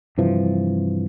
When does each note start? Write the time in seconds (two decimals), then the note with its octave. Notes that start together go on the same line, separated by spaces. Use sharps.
0.18 G2 C3 E3 F3